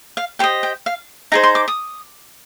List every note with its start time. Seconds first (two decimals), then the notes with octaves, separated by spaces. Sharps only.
0.17 F5
0.39 G4 C5 D#5 G5
0.63 G5
0.86 F5
1.32 D#4 G#4 C5 A#5
1.43 C6
1.55 D6
1.68 D#6